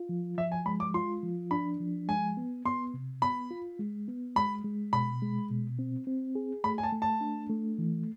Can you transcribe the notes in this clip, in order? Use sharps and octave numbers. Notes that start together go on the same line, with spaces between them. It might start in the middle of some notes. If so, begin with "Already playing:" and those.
Already playing: F4
F3
F3 E5
G#5
G#3 B5
D6
F4 C6
F3
D4 B5
F3
G#3 G#5
B3
B3 C6
C3
B3 B5
F4
G#3
B3
G#3 B5
G#3
B2 B5
G#3
B2
C4
C4
G#4
A3 B5
G#5
A5
A3
A5
D4
A3
E3